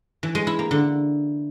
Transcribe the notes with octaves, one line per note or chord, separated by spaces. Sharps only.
E3
G#3
E4
A#3
D3